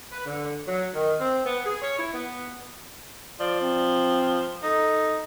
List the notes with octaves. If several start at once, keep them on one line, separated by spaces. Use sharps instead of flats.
B4
D3
F#3
D#3
C4
B3
G#4
C#5
E4
B3
F3 D5
C4
D#4 A4